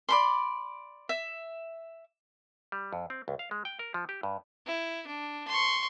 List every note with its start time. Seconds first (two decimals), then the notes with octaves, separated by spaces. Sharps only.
0.09 D5 B5 C6
1.09 E5
2.72 G3
2.93 F2
3.10 C4
3.28 C#2
3.39 F5
3.51 G#3
3.65 G5
3.79 A#4
3.94 F3
4.09 G4
4.23 G2
4.66 E4
5.07 D4
5.48 C6 C#6